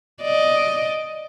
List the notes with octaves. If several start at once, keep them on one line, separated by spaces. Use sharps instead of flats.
D5 D#5